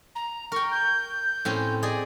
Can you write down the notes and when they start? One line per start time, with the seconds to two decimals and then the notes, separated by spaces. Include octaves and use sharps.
0.15 A#5
0.52 A#4 G5 C#6
0.71 G6
1.45 A2 C4 C#4
1.83 G#4 D5 D#5